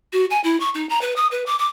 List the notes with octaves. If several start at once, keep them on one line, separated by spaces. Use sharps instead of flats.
F#4
G#5
E4
C#6
D#4
A#5
B4
D#6
B4
D6
D6